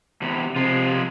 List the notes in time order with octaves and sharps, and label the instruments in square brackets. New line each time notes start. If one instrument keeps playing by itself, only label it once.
[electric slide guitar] E2 C3
[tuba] C3 [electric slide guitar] F3 G#3 F4